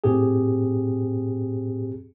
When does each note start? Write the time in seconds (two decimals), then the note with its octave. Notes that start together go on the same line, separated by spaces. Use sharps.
0.04 A2 C4 G4 G#4